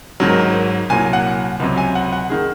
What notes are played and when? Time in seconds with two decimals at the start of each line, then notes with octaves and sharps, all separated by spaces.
0.20 G#1 G#2 D#3 F#3
0.90 C2 A#2 F#3 G#5
1.13 F#5
1.60 C#2 C3 F#3
1.78 G#5
1.95 F#5
2.13 F#5
2.30 D#3 G#4